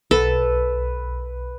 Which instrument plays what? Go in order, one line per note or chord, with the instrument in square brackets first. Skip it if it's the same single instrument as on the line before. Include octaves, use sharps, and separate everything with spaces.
[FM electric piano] B1 [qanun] A4 [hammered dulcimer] B4